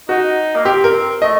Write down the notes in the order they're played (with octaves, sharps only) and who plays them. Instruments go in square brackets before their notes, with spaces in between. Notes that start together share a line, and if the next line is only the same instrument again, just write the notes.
[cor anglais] D#4 [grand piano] F#4
[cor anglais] A#3
[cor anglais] C4 [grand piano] G4
[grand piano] A#4
[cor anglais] A3 [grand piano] D#5